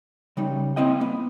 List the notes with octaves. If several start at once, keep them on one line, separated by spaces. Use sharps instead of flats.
C#3 G3 D#4
A#3 C4 E4 D#5 G5
A#3 B3